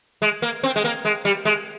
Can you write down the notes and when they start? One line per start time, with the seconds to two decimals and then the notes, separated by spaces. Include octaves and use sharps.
0.22 G#3
0.42 A#3
0.63 C4
0.76 G#3
0.84 A#3
1.05 G#3
1.25 G3
1.45 G#3